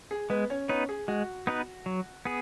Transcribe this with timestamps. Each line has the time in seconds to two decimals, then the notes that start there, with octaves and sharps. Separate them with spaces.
0.11 G#4
0.30 G#3 B3 B4
0.50 C#4 C#5
0.69 B3 C#4 D#4 B4 C#5
0.89 G#4
1.08 G#3 F#4
1.47 B3 D#4 B4
1.86 F#3
2.25 B3 G#4